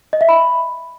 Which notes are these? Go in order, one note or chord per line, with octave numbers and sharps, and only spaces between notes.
D#5
E5
B5